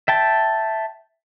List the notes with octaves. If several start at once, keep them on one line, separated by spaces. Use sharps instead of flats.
E5 G5 A5